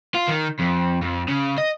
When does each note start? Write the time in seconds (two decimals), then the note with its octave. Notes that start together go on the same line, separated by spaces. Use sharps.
0.15 F4
0.28 D#3
0.60 F2
1.02 F2
1.28 C#3
1.58 D#5